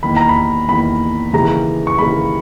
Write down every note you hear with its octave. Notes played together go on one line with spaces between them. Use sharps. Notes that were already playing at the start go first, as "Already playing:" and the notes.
E2 D#3 A#3 B5
A#5
B5
E2 D#3 A#3 B5
D#2 C#3 E3 G#3 A#5
C#6
D#2 C#3 E3 G#3 B5